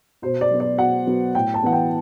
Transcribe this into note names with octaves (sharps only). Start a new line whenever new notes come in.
B2 C5
D5
F#3 B3
D5
B2 F#5
F#3 B3
A2 G5
A5
E3 B3 F#5
G5